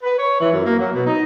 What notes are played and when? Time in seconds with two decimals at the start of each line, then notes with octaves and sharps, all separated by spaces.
0.03 B4
0.19 C#5
0.41 E3
0.53 F#2
0.66 A#3
0.79 F#3
0.94 B2
1.06 D#4